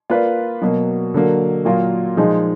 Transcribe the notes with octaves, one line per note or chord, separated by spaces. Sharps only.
A#3 F4 B4 D5
B2 F#3 A#3
D3 F#3 A#3
A#2 F#3 A#3 F4 A#4
A#2 F3 G#3 D#4 G#4